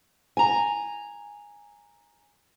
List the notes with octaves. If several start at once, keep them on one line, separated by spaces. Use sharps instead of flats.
G#5 A#5